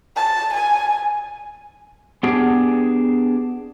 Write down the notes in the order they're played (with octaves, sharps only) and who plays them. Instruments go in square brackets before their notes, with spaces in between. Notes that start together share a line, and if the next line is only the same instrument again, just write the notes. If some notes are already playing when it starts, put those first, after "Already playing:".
[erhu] A5
G#5
[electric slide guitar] B3 D4 G4 G#4